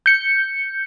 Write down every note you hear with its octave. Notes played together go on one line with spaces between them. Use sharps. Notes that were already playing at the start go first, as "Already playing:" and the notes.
G6 C#7